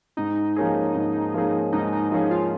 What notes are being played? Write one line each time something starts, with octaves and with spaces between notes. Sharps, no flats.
G#2 D#4
F3 A#3 C#4 G#4
G#2
F3 A#3 C#4 G#4
G#2 D#4
D#4
F3 A#3 C#4 D#4 G#4
F4